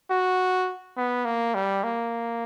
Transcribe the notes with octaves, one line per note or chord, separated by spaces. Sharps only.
F#4
B3
A#3
G3
A#3